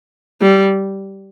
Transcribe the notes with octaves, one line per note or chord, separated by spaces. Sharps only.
G3